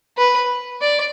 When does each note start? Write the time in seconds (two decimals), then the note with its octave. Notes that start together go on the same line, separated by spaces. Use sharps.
0.18 B4
0.81 D5